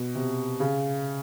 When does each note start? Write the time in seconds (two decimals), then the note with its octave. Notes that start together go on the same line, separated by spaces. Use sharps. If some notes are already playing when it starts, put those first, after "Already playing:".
Already playing: B2
0.15 C3
0.60 C#3